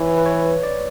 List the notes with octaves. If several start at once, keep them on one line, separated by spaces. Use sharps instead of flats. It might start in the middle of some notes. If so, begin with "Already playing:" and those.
Already playing: E3 C#5
B4
C#5
D5